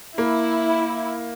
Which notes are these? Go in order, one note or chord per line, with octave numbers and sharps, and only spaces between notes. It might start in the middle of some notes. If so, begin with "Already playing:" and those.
A#3 E4